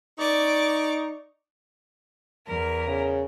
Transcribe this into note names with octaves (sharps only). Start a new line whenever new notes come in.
D#4 D5 C#6 D6
E2 A#4
C#3